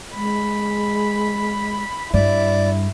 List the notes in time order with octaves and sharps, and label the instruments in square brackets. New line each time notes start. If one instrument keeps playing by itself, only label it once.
[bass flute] G#3 [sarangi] B5
[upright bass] G2 [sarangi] E4 [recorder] D5